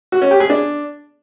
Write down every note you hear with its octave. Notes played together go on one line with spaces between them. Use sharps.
F#4
C#4
G4
G#4
D4